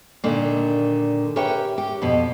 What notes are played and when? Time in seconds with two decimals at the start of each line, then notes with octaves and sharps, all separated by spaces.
0.24 A#2 D3 D#3 A#3
1.36 G4 A#4 B4 C#5 E5 G5
1.78 G4
2.02 F2 B2